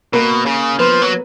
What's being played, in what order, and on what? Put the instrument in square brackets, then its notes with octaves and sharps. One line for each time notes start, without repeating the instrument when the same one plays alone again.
[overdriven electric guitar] B2 [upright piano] A#3 A#4
[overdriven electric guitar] C#3
[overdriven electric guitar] F3 [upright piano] B3 B4
[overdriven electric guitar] F#3